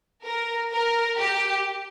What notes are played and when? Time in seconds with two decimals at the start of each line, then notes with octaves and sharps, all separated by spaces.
0.23 A#4
0.71 A#4
1.18 G4